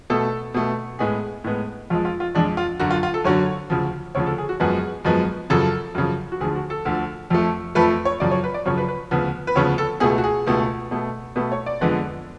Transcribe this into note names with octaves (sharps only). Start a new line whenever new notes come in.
B2 A3 A4
B2 A3
A2 G#3 B3 G#4
A2 G#3 B3
F2 F3 G#3 F4
F4
F4
F2 F3 G#3 D4
F4
F#2 D3 F#3 F#4
F4
F4
A4
F#2 D3 F#3 C#5
D2 C#3 F3
D2 C#3 F3 C#5
A4
G#4
F#4
F#2 F3 G#3 B3 G#4
F#2 F3 G#3 B3
F#2 C#3 F3 A4
F#2 C#3 F3
F#4
D2 D3 F3 G#4
F#4
A4
D2 D3 F3
F2 F3 A3
F2 F3 A3 B4
C#5
F#2 C#3 F3 D5
C#5
B4
D5
F#2 C#3 F3 C#5
B4
B4
D2 C#3 F3 B3
B4
D2 C#3 F3 B3 C#5
A4
C#2 B2 A3 G#4
F#4
G#4
C#2 B2 A3
B2 A3
B2 A3 B4
C#5
D5
F2 D3 G#3 B3